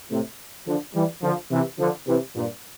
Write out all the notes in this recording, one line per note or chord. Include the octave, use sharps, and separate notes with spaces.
A2 C3
D3 F3
E3 G3
D3 F3
C3 E3
D3 F3
C3 E3
G2 A#2